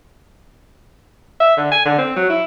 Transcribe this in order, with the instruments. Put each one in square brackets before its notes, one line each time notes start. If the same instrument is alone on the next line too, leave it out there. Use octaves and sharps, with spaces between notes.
[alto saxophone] E5
D3
G#5
D3
C4
F#3
E4